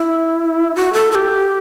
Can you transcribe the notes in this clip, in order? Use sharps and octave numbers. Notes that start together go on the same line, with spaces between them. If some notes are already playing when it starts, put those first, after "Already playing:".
Already playing: E4
F#4
A4
A4
G4